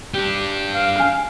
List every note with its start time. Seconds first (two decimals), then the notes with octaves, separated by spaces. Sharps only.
0.14 G3 D4 G4
0.73 F5
0.96 G#5 F6